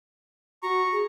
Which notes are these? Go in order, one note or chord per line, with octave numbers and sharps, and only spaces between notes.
F#4 A#5 C#6
G#4